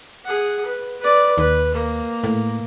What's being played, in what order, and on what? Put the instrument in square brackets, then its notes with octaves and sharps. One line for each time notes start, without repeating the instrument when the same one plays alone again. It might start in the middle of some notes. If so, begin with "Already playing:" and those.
[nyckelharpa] G#4 F#5
B4
B4 D5
[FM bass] D#2 [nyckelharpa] B4
[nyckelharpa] A#3
[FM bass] A2